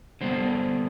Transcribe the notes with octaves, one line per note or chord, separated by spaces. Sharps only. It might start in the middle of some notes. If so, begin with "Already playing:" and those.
D3 G3 B3 D4 C5